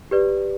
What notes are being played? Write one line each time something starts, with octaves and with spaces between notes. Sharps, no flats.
G4 B4 D5